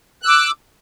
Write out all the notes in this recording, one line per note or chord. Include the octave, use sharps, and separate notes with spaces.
D6 E6 F#6